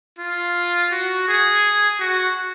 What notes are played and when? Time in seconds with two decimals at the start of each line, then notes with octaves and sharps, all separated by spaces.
0.19 F4
0.92 F#4
1.28 G#4
2.00 F#4